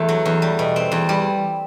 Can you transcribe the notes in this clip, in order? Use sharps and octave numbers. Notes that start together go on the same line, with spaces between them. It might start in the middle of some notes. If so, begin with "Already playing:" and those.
Already playing: E2 A3
F#3
E2
G3
B2
C4
E2
G3